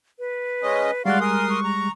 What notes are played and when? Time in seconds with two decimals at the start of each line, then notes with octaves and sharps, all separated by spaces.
0.19 B4
0.63 G#3 C#4 D#5
1.05 G3 G#3 F#4 D5 F5 C6 F#6
1.21 A#4 G#5 C6 D#6
1.49 C#6
1.64 A#5